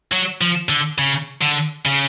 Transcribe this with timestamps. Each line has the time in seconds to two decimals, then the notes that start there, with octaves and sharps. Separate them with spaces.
0.12 F#3
0.41 F3
0.69 D3
0.99 C#3
1.42 D3
1.86 C#3